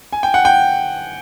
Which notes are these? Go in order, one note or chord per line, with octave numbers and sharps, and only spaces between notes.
G#5
G5
F#5
G5